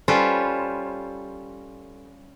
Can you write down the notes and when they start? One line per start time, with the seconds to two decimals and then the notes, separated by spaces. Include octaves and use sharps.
0.08 G3 C#4 F4 A4 B4 C5